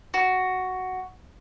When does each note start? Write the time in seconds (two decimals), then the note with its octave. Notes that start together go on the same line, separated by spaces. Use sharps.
0.14 F#4